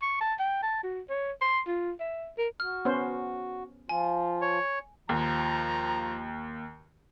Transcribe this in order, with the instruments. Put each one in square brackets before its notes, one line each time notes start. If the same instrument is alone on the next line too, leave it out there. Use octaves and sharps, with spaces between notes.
[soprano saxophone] C#6
A5
G5
A5
F#4
C#5
C6
F4
E5
A#4
[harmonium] F#4 [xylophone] F6
[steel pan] B3 C#4 C5
[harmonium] F3 F4 [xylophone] G#5
[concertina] C#5
[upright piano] D#2 [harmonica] F3 A#5